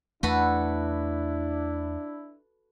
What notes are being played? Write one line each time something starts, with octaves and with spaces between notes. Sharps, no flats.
E2 A3 D4 E4 F#4 A4 B4